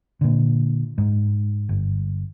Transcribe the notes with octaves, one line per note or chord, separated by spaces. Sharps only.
A#2 D3
G#2
G1